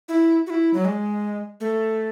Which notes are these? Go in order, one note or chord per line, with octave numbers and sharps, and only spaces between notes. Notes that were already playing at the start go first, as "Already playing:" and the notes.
E4
F#4
E4
F#3
G#3
A3